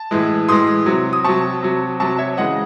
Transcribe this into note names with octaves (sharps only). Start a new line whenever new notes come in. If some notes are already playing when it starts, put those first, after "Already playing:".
Already playing: A5
A2 E3 G#3
A2 E3 G#3 C6 D#6
C3 F#3
D#6
C3 F#3 A5 C#6
C3 F#3
C3 F#3 A5 C#6
C#5 E5
C#3 E3 G#3 D#5 F#5